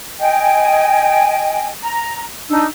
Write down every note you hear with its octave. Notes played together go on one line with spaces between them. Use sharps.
D#5 G5 G#5
A#5
D4 D#4 E6